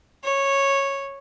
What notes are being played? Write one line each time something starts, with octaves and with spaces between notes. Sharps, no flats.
C#5